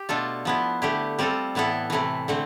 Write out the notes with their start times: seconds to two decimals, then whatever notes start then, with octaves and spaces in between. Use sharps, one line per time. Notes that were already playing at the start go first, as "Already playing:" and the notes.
Already playing: G4
0.09 B2 A3 D4 F4 A4
0.45 F3 B3 E4
0.82 D3 A3 E4 G4
1.19 G3 C4 F4 A4
1.55 A2 E3 B3 E4 A4
1.90 C3 E3 A3 E4
2.28 D3 A3 C4